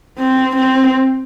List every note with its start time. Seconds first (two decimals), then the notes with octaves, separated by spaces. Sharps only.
0.18 C4
0.56 C4